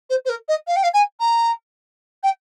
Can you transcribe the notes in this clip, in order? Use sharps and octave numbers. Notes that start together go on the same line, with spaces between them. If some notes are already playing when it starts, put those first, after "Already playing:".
C5
C5
A#4
D#5
F5
G5
F5
G#5
A#5
G5